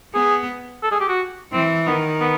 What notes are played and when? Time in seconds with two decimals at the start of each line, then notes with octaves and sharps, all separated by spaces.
0.14 B3 G#4
0.83 A4
0.91 G#4
1.00 G4
1.09 F#4
1.53 E3 C4
1.86 D#3 B3
2.20 B3